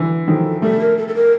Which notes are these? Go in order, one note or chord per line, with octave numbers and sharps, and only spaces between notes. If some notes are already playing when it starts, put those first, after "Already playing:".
Already playing: D3 E3
D#3 F3 A4
G3 A3 A4
A#4
A4
A4
A#4